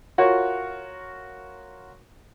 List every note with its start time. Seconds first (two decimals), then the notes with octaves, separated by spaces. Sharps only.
0.18 F4 F#4 A#4 C#5